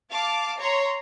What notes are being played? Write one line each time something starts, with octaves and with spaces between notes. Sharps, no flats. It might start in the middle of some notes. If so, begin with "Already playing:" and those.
F5 A5 D6
C#5 A#5 C6